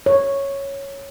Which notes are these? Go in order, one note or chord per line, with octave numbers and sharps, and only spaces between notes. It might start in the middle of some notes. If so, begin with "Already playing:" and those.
C#5